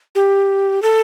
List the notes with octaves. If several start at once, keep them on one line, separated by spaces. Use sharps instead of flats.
G4
A4